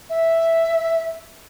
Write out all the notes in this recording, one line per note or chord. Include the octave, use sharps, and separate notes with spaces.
E5